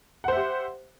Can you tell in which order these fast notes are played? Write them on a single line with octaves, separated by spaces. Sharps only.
F#5 C5 E5 G4